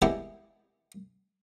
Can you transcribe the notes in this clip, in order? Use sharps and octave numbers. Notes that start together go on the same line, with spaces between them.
G3 G#3 A#3 B3 E4 G4